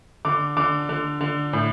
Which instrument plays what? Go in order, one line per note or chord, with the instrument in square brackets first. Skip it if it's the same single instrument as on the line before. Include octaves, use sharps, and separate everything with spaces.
[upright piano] D3 D6
D3 D6
D3
D3
A2